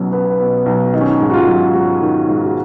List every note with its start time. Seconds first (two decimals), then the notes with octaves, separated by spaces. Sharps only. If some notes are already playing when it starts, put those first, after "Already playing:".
Already playing: B1 B2 F#3 C#4
0.12 B3
0.39 B2
0.66 B1
0.93 D#3 D#4
1.01 C#4
1.09 D#4
1.20 G#2
1.30 F#4
1.34 F4
1.47 F#3
1.66 F4
1.74 G#2 F#4
2.02 D#3
2.29 G#2
2.45 F#4